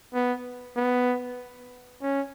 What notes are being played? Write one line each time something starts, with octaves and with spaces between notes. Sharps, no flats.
B3
B3
C#4